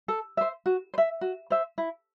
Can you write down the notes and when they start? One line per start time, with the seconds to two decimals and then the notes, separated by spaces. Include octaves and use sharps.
0.08 A4
0.37 C5 E5
0.66 F#4
0.94 C5
0.98 E5
1.21 F#4
1.50 C5 E5
1.78 E4